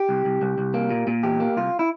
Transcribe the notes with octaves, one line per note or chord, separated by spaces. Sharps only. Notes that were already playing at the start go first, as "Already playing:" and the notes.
Already playing: G4
C2
C2
C2
C2
A#3
A#2
A#2
E2 G4
A#3
C2 F4
E4